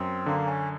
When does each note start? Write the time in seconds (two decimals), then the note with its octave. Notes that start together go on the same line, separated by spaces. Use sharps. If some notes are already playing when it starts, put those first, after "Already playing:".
Already playing: F#2 C4
0.26 D3 A#3
0.47 C#4